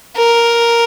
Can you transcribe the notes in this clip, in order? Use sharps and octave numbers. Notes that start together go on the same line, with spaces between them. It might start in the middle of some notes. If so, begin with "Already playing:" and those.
A#4